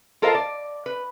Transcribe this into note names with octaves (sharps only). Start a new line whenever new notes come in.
F4 A4 A#4 C5 D#5 F5
D5
B4